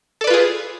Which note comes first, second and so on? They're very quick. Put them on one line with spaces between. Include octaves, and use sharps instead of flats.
A4 D5 B4 F4 G#4